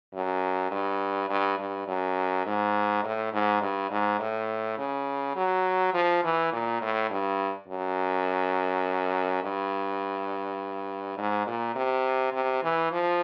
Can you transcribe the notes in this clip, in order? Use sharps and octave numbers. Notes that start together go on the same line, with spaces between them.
F#2
G2
G2
G2
F#2
G#2
A2
G#2
G2
G#2
A2
C#3
F#3
F3
E3
A#2
A2
G2
F#2
G2
G#2
A#2
C3
C3
E3
F3